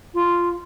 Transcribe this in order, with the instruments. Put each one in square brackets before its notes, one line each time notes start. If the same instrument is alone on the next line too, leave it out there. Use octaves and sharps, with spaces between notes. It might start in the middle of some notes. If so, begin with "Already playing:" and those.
[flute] F4